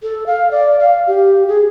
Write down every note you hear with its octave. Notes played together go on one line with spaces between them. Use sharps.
A4
F5
D5
F5
G4
G#4